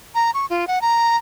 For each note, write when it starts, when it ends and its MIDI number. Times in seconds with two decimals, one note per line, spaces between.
0.15 0.31 82
0.34 0.46 85
0.50 0.68 65
0.68 0.81 78
0.82 1.17 82